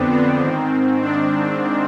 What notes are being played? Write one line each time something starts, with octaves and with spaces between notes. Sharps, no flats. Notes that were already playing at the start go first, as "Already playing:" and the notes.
Already playing: F2 D3 B3 C4 D4
C4
G#2 D#3
D4